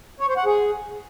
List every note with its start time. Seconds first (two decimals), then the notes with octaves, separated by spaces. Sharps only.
0.20 C#5
0.29 C5
0.37 F#5
0.46 G#4